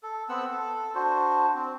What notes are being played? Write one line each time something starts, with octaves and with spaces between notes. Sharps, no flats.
A4
B3 C4 F#5 E6
A4
D4 F#4 C5
C4